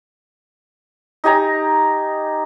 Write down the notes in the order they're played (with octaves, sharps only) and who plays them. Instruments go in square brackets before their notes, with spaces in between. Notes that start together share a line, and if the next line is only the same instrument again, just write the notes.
[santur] D#4 G4 G#5 A#5